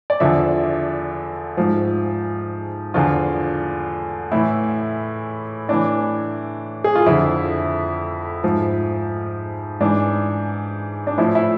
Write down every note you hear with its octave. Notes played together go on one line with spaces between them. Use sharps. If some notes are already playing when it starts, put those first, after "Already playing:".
D5
E2 D3 F3 E5
G#2 F3
E2 D3 F3 F4
A2 E3 E4
A2 E3 D4
G#4
F4
F2 D3 F3 E4
G#2 F3
G#2 E3 D4
D4
A2 F3 E4
E4